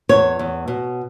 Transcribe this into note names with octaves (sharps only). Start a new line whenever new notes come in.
E2 C#5
E2
B2